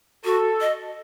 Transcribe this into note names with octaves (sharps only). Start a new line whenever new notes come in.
F#4 A4
D#5